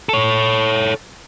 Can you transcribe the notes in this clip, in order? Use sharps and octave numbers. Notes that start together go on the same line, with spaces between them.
A4 C#5